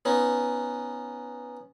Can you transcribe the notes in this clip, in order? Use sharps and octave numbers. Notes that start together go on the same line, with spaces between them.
B3 C#4 D#4